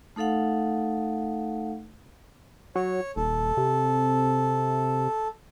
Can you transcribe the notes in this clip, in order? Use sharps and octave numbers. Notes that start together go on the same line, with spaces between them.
A3 D#4 A4 F5 F#5
F#3 C#5
D#1 A4
C3